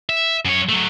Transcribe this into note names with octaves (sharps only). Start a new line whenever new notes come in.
E5
F#2 C#5
F#3 A3